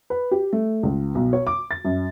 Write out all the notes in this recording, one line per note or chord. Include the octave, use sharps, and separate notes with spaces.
B4
G4
A3
C#2
B1
C#5
D6
A6
F#2